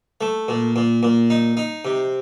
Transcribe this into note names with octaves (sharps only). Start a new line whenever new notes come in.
A3
A#2
A#2
A#2
D#4
D#4
C3